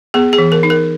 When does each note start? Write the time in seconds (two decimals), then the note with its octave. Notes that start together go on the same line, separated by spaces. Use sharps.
0.14 B3 G#4
0.33 G#4
0.38 E3
0.52 A#4
0.63 D#4
0.70 A#4